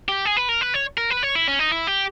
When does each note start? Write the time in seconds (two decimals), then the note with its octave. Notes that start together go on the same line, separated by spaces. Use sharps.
0.09 G4
0.25 G#4
0.37 B4
0.49 A#4
0.61 B4
0.74 C#5
0.98 A#4
1.10 B4
1.23 C#5
1.35 E4
1.48 C#4
1.59 D#4
1.71 E4
1.87 G4